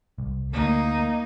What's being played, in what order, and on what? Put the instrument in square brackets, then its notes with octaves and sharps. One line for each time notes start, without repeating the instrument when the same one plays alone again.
[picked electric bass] C2
[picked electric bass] D2 [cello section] A#3 [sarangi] D#4